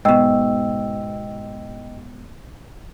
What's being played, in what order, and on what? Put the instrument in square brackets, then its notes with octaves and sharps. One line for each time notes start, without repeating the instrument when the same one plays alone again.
[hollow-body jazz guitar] G#2 B2 [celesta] D#5 G5 E6